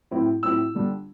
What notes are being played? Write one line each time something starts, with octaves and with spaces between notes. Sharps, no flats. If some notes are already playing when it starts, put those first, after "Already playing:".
A2 F#3 C4 E4
A2 F#3 C4 E4 E6
D3 G3 D4